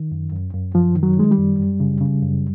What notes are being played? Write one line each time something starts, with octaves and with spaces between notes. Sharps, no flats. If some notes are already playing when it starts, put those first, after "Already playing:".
Already playing: D#3
F#2
F#2
F#2
F#2 F3
D#3
F#3
D#3 G#3
G3
F#2
F#2
C#3
C#3
F#2